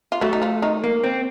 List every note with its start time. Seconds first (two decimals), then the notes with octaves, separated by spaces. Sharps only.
0.12 F4
0.21 F#3 A3 F#4
0.33 D#4
0.42 F3 F4
0.62 D#3 D#4
0.84 A#3
1.04 C4